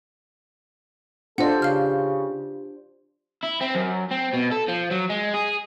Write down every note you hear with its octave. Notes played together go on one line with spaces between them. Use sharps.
D4 F4 G4 A4 C5 D#5 F#5
C#3 F5 F6
E4
C4
F#2
C4
B2
A4
F3
F#3
G#3
G#4